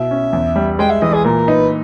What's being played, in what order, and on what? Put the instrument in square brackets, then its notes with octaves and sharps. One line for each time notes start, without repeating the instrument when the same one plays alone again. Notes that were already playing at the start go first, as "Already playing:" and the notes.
Already playing: [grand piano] B2 E4 [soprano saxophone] E5
[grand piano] C#4
E2
G3
[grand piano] G#3 [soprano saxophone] G5
[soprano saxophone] E5
[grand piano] E3 [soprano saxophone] D#5
[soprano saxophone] G#4
[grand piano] A#2 [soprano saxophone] A#4
[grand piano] D#4 [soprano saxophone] B4